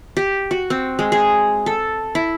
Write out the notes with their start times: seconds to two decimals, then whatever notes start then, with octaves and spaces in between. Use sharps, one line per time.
0.17 G4
0.51 F#4
0.70 C4
0.99 G#3
1.12 G#4
1.66 A4
2.15 E4